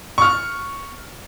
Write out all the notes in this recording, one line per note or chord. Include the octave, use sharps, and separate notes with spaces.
C#6 F6